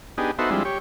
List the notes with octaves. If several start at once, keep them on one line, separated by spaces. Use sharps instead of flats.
B3 D4 D#4 G4 G#4
B3 D#4 F#4 A4 C5 E5
F3 G3 G#3 C4 D4 E4
G4 C#5